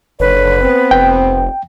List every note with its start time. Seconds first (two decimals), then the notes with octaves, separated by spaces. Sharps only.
0.20 F#1 D3 B4 C#5
0.60 B3 C4
0.91 F1 G5